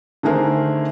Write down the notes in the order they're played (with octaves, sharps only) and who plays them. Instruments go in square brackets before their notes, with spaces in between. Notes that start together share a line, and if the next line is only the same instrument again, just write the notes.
[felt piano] D3 D#3 A3 G#4 A#4 C5